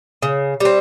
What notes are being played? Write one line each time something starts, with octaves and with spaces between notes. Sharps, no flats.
C#3
G3 C4